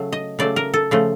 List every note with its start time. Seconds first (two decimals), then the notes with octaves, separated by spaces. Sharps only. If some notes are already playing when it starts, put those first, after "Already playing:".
Already playing: C#3 F#3 A3
0.12 D#5
0.39 C#3 F#3 A3 D5
0.56 A#4
0.74 A4
0.91 C#3 F3 A3